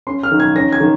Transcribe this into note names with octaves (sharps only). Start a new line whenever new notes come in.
C#4 C6
F6
D#3
G#6
C#4 A#6
G#6
D#3